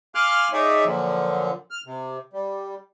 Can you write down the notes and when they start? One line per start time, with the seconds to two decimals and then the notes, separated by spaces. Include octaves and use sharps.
0.15 F5 G#5 C6 D6 F6 F#6
0.53 D#4 G#4 C#5 D5 E5
0.85 A#2 D3 F3 F#3
1.71 F6
1.86 C3
2.33 G3